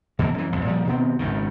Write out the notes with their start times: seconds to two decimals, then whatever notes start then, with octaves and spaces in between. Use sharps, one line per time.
0.19 B2 E3 A3 A#3
0.34 F#2 E3
0.52 B1 F2
0.65 A#2 F3 G3
0.87 B2 D#3 B3 C4
1.19 G#1 C#2 F#2 D#3